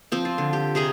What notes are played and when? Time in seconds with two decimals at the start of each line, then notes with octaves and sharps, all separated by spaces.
0.12 F3 C4
0.25 F4
0.38 D3
0.53 G4
0.75 C3 G#4 A#5